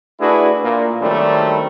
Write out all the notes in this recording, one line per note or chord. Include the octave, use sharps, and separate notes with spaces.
A3 D4 E4 F#4 G#4 B4
A#2
D#3 F#3 G3 A3 C4 D4